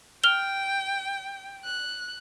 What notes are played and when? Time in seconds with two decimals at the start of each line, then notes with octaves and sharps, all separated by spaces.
0.24 G5 F6 F7 G7
1.65 F#6